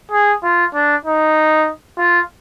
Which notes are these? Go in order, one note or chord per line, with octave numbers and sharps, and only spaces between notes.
G#4
F4
D4
D#4
F4